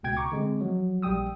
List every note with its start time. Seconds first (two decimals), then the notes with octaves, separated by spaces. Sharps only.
0.03 C#2 B2 G5 G#6
0.17 A#5 C#6 D6
0.32 D3 G#3 C4
0.61 F3 F#3
1.02 A#1 G3 G5 D#6 E6